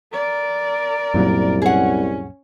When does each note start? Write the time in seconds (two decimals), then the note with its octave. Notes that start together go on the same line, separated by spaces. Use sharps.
0.13 A#4 D5
1.14 C2 F#2 A#2 F#3
1.62 C#4 G#4 F#5